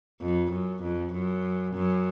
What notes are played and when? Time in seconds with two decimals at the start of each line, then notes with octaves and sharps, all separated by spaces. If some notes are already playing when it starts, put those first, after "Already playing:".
0.22 F2
0.52 F#2
0.83 F2
1.13 F#2
1.74 F#2